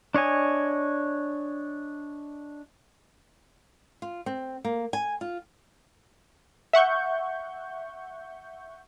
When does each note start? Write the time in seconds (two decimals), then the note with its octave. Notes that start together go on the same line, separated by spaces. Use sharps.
0.14 D4 C#5 D#5 G#5
4.02 F4
4.26 C4
4.65 A#3
4.93 G#5
5.21 F4
6.73 E5 F#5 C#6 G6